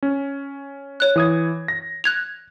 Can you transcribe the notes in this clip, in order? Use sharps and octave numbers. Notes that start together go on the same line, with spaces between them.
C#4
C#5 F#6
E3 D#6 G#6
A#6
F#6 G#6 F7